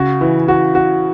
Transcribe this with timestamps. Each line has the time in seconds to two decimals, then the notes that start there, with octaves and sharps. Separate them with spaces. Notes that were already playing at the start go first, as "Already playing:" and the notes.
Already playing: C#3 F#4
0.21 E3
0.48 F#4
0.75 F#4